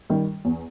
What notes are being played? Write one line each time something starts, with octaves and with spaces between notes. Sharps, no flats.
D#3 G3
E2